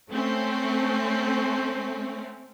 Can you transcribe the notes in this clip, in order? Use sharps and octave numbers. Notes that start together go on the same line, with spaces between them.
A3 C4 C#4